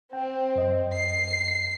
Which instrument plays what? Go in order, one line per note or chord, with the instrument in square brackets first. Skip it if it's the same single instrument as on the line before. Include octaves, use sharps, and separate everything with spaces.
[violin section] C4 [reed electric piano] G5
[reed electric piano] F#2 D#5
[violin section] C7